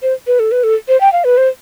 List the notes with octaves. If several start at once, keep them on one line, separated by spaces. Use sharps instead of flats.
C5
B4
A4
B4
A4
C5
G5
F5
B4
C5